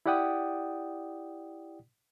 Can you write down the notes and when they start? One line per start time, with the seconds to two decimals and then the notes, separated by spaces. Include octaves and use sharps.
0.06 E4 G4 D5 F#5 G5 D#6